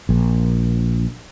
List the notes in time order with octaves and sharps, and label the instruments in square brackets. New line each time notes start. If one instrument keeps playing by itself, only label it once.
[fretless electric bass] A#1